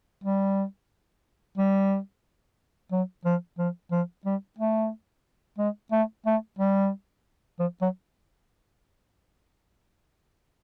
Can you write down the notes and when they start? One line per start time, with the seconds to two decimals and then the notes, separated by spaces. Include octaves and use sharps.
0.24 G3
1.57 G3
2.92 F#3
3.25 F3
3.58 F3
3.92 F3
4.25 G3
4.58 A3
5.58 G#3
5.92 A3
6.26 A3
6.59 G3
7.59 F3
7.81 F#3